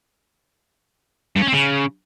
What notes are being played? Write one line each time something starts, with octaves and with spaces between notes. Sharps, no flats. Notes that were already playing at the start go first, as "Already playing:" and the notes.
G2
C#4
C4
C#3